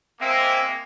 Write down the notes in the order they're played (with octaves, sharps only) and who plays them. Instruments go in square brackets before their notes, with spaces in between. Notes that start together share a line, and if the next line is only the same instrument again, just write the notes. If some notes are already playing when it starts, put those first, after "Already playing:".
[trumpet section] G#3 A#3 [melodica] C4 E5